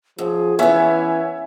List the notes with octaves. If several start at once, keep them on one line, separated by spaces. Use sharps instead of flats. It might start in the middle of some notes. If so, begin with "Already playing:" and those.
F#2 F3 G#4
E3 B3 C#4 C#5 E5 G#5